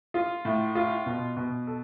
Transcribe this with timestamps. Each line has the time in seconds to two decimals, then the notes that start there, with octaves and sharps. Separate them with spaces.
0.14 F4
0.45 A2
0.75 F4
1.06 B2
1.37 B2
1.67 A4